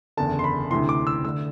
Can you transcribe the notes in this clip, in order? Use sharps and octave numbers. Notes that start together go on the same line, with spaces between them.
F#1 E2 D3 A5
C6
B5
D2 C3 E3 C6
D6
E6
D2 D3 E6